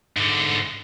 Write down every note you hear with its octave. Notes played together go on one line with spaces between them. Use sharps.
G#2 D3